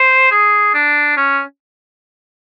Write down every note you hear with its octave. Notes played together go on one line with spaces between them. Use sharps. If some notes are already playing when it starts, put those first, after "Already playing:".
Already playing: C5
G#4
D4
C#4